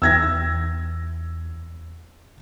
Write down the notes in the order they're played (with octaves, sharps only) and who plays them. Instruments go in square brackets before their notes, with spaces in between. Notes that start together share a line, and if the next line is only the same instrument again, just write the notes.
[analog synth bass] E2 [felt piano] E6 G#6 A#6